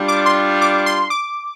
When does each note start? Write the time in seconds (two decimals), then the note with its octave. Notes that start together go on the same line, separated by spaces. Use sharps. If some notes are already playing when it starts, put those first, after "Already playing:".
Already playing: G3 D4 F4
0.08 D6
0.26 C6
0.61 D6
0.86 C6
1.10 D6